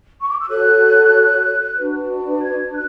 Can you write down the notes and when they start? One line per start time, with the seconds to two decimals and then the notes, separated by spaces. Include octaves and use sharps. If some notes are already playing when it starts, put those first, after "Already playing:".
0.20 C#6
0.29 D6
0.39 E6
0.48 F#4 A4 C#5 F#6
1.77 D4 F#4 B4
2.41 G#6
2.73 F#6